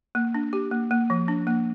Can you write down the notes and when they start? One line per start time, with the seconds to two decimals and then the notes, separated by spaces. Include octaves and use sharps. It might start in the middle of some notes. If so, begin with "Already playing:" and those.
0.15 A#3
0.34 D4
0.53 G4
0.71 A#3
0.91 A#3
1.10 F3
1.28 D4
1.47 A#3